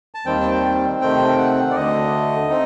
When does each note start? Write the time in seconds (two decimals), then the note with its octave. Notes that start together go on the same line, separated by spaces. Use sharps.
0.15 A5
0.26 D#2 D#3 G3 C4 G5
0.40 A5
0.51 G5
1.01 C3 D#3 A3 C4 G5
1.38 F#5
1.71 D5
1.75 D2 D3 A3 D#5
2.49 C4 D#4